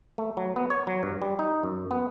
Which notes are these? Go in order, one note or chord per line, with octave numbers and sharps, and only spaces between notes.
A3
F#3
B3
C#5
F#3
G2
G3
D#4
F#2
B3